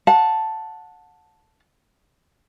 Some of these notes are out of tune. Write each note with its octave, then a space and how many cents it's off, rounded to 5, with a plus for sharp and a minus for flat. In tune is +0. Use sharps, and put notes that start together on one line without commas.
F#5 -30 A5 +0